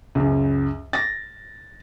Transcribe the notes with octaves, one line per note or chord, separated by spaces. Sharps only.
C#2 F#2
A6 A#6